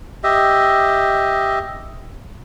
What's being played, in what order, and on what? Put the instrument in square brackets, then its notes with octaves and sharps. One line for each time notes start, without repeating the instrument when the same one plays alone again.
[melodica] G4 D#5 E5